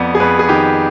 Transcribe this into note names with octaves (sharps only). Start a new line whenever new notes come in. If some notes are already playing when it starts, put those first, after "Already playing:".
Already playing: F2 B3 D5
G#4
F2 B4
G#4
D#3 G4